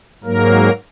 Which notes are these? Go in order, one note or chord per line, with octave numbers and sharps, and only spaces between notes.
G#2 F#3 A#3 A#4